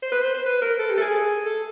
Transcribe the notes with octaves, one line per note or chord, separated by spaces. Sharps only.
C5
B4
C5
C5
B4
A#4
A4
G4
A4
G#4
A4